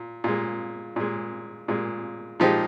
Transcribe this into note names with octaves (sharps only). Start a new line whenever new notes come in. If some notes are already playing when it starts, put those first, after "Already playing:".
Already playing: A#2
A#2 G#3
A#2 G#3
A#2 G#3
A#2 F3 G#3 D#4 G4